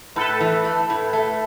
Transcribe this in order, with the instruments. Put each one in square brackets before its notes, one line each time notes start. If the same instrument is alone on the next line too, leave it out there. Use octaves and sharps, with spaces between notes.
[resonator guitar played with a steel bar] A2 [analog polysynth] A4 B4
[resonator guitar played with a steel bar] E3
A3
A2
A3